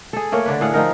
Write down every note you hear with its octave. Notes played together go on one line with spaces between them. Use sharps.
G#4 A4
A3 A#3 A#4 C#5
D3 D4 B4
A2 G#4 F5 F#5
F3 D#4 A#4